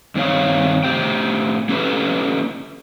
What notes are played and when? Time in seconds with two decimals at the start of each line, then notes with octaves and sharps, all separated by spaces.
0.15 G2 D#3 C4 D4 C#5 F5
0.84 A2 G4 C5 G5
1.69 A#3 C#4 G4 A4 B4